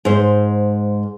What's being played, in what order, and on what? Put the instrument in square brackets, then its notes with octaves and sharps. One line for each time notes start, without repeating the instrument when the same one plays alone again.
[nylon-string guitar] G#2 C5